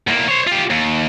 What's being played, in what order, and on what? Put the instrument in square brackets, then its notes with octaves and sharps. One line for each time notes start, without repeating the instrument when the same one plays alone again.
[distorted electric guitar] E2 A#3
C5 C#5
F4 G4
D#2